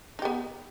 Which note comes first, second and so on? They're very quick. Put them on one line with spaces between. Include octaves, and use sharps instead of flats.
D#4 G4 B3